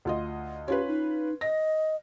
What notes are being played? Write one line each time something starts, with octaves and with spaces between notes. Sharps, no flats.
D2 F4 D#5
C#4 F4 G4 B4
D#4
D#5 A#6